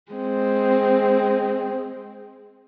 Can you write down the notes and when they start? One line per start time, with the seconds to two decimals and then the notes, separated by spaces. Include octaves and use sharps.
0.12 G#3 C4